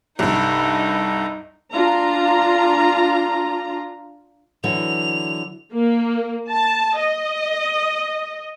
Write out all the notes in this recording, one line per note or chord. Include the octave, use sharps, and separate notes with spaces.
C2 G2 D#4 A4 F#5 A#5
D4 F4 A#5
D3 E3 F#3 F7
A#3
A5
D#5